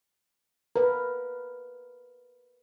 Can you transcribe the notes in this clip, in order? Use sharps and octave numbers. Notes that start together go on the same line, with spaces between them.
A#4 B4